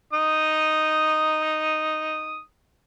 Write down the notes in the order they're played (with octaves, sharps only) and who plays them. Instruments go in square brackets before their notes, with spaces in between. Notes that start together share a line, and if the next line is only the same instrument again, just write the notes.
[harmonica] D#4 D#6